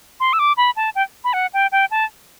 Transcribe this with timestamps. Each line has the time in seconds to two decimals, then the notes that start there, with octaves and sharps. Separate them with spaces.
0.20 C6
0.33 E6
0.39 D6
0.57 B5
0.76 A5
0.95 G5
1.24 B5
1.33 F#5
1.54 G5
1.72 G5
1.91 A5